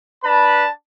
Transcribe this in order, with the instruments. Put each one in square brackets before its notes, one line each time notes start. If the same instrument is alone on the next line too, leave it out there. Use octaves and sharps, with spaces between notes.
[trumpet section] D4 B4 A5 B5